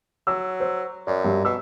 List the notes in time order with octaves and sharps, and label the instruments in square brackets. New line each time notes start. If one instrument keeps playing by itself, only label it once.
[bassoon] F#3 [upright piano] E6
[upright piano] C5
[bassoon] F#2 [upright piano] D5
[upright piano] G2
[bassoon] B2 [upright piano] E6